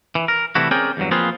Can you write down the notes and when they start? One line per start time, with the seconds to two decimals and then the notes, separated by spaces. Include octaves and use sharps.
0.15 E3
0.28 A#4
0.55 C3 E3 G3 A3 E4 F#4
0.71 C4 C#4 G#4 A#4 D5 G5
0.97 E2 G2 F#3
1.11 F3 A#3 C4 F4 G#4 B4